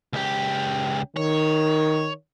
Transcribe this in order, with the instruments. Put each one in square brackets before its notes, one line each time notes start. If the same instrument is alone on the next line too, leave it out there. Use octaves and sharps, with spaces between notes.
[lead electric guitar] C#2 G4
[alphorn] D#3 [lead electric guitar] C#5